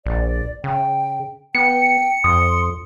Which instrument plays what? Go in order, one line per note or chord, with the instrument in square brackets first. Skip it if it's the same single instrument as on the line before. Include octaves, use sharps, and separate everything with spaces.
[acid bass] A#1 [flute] D5
[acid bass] C#3 [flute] G5
[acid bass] B3 [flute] G5 [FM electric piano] C#7
[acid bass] F2 [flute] C6 [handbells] D#6